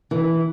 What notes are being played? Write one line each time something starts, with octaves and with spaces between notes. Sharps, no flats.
E3